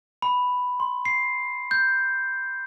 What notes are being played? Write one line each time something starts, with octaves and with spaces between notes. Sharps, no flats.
B5
C6
C7
G6